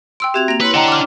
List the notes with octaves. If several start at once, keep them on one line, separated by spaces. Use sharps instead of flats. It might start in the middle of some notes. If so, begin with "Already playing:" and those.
G5 C6 E6 D7
C4 F#4 G4 E5 G#6 F7
A#3 A#6 F7
E4 B4 C#5 C6
D4 D#5 F#5 G5 A#5
D6 F6